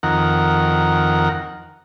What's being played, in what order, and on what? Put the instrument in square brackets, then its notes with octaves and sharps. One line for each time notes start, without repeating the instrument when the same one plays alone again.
[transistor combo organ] F2 D#3 A#4 F#5